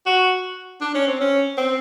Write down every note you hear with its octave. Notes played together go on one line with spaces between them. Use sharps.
F#4
D4
C#4
C4
C#4
C4